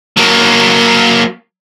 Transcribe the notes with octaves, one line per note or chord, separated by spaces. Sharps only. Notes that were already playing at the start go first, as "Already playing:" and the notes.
F#3 A#3